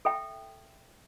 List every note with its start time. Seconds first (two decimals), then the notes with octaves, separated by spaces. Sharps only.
0.05 A4 E5 G5